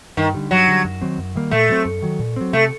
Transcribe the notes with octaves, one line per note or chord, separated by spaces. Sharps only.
G2 D#3
D3 G3
G2 F#3
D3 G3
F#2
D#3 F#3 C4
F#2
D#3 G3 A#3
A#2 A3
F#3 C4
F#2
D#3 F#3
A#2
F#3 C4
C3 A3